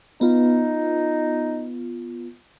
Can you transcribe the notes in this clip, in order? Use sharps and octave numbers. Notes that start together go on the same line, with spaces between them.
B3 D#4 F4